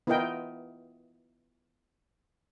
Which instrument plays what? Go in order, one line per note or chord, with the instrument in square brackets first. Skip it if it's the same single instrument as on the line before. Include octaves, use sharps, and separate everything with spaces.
[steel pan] B3 E4 F4 A#4 D#5 G5